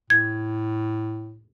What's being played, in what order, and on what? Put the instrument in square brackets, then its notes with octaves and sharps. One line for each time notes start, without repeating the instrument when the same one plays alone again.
[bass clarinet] A2 [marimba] G#6